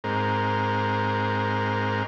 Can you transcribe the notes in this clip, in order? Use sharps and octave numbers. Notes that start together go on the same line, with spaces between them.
G#2 C4 A#4